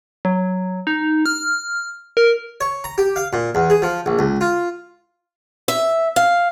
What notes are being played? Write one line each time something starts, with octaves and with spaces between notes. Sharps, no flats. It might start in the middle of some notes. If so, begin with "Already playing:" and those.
F#3
D#4
F6
A#4
C#5
A#5
G4
F5
A#2
E2
G#4
F3
A#1
C#2
F4
E5
F5